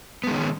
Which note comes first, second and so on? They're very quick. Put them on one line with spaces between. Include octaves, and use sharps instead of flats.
B3 G#3 D#3 C#4